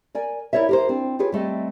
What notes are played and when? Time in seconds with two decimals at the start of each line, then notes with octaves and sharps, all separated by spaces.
0.15 A#4 D5 G#5
0.53 E4 A#4 C#5 D5 E5
0.69 G4 A#4 C5
0.89 C4 D4
1.19 F4 G4 G#4 B4 C#5
1.32 G3 A3 C4 D#5